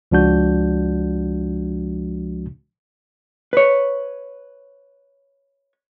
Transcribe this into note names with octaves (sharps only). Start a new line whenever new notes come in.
C#2 F3 G#3 D4 F#4 G6
B4 C#5